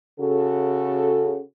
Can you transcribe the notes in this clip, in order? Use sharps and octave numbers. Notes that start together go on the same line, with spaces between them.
C#3 F#4 A4